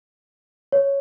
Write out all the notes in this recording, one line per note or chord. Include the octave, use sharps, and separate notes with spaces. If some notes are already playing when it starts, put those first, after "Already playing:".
C#5